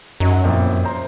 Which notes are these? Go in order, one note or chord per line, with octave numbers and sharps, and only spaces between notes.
F#2 F#3 D#4
F2 A#2 E4
C5 A#5